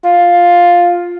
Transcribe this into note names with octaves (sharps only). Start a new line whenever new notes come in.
F4